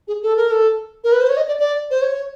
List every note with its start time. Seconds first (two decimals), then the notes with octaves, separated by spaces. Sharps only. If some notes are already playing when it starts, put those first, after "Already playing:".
0.08 G#4
0.23 A4
0.36 A#4
0.51 A4
1.04 A#4
1.13 B4
1.21 C5
1.29 C#5
1.37 D#5
1.48 D5
1.59 D5
1.91 C5
2.02 C#5